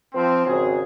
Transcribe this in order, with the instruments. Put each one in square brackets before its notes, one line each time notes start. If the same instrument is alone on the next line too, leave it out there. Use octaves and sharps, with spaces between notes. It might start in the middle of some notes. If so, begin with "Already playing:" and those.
[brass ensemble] F3 C4
G#1 C#3 C4 F#4 G#4